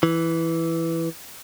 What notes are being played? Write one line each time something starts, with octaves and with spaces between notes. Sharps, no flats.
E3